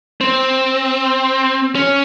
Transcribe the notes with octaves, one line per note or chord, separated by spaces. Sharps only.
C4
C#4